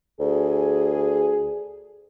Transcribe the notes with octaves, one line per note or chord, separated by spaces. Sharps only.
D2 G#4